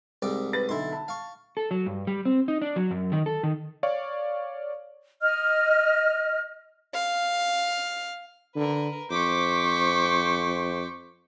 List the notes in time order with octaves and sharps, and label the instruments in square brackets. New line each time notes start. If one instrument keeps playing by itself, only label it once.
[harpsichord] C2 G#2 D5
[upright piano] B4 A6
[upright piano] B1 D3 [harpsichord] E4 C6
[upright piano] A5 B5
[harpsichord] F5 C#6
[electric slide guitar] A4
F#3
G2
G3
C4
D#4
D4
F#3
F#2
D#3
A4
D#3
[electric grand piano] C#5 D5 F5 C#6
[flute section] D#5 F6
[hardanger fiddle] F5
[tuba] D3 [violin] A#4 B4
[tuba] F2 [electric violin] C5 C#6 [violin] D6 B6